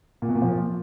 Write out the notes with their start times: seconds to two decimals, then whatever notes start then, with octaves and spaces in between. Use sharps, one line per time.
0.22 A#2
0.29 B2
0.35 A#2
0.42 F3